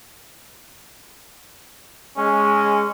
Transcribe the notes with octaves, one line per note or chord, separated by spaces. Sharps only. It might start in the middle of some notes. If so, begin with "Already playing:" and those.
G#3 C#4